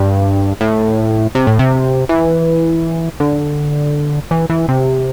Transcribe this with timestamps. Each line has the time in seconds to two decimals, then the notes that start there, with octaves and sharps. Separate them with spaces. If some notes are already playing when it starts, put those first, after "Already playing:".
Already playing: G2
0.61 A2
1.35 C3
1.47 A2
1.59 C3
2.09 E3
3.20 D3
4.31 E3
4.50 E3
4.68 C3